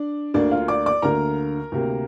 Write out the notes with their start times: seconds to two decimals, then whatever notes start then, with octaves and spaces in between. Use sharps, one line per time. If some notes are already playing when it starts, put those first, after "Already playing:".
Already playing: D4 D5
0.34 D2 D3 A#3 D4 D5
0.51 F4 F5
0.68 D5 D6
0.86 D5 D6
1.02 D2 D3 A#3 A#4 A#5
1.72 D2 C3 A#3